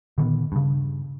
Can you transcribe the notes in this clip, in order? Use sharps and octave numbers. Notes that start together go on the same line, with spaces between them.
A#2 D3 D#3 B3
G2 C#3